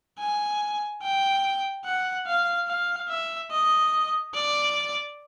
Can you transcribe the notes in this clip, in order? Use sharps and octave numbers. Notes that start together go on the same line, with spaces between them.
G#5
G5
F#5
F5
F5
E5
D#5
D5